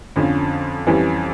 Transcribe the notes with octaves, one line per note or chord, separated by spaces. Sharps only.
F2 D3 F3 C#4
F2 E3 G3 C#4